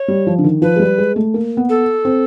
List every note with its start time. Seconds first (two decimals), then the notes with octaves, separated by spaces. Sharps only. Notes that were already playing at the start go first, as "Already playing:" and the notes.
Already playing: C#5
0.08 G3
0.27 F3
0.38 D3
0.44 D#3
0.62 F3 B4
0.76 G#3
0.80 G3
0.98 G#3
1.16 A3
1.34 A#3
1.57 B3
1.69 A4
2.05 C4